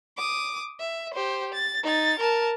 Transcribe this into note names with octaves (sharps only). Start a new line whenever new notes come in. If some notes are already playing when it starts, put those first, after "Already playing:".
D6 D#6
E5
G4 C5
A6
D#4 A6
A#4 A5